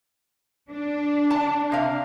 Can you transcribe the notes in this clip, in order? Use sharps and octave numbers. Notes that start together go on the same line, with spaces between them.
D4
A5
C3 F5